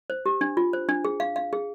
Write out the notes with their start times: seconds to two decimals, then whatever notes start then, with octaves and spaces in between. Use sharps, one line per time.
0.10 C5
0.26 G4
0.41 D4
0.57 F4
0.73 C5
0.89 D4
1.05 G#4
1.20 F5
1.36 F5
1.53 G#4